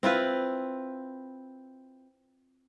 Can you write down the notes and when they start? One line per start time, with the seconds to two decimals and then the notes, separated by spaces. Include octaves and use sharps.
0.03 C4 E4 F4 B4